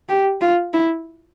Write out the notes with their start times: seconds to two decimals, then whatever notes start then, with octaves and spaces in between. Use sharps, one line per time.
0.09 G4
0.41 F4
0.73 E4